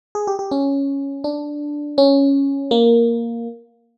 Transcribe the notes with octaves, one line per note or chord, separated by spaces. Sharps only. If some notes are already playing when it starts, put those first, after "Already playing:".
G#4
G4
G4
C#4
D4
C#4
A#3